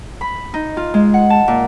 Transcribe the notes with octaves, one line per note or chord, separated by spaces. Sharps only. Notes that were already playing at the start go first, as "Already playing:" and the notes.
B5
D#4
F4
G#3
F#5
A5
A#2